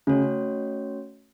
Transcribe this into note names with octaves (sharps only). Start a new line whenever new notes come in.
C#3 A3 C#4 F#4 C#5